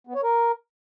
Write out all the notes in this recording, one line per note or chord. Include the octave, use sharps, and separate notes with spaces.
B3
C#5
A#4